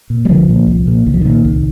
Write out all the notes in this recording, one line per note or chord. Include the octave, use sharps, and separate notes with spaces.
A#2
G3
C2 D3 F3
A#2
C2
A#2
C2 D#3
F3
A#2 D#3
C2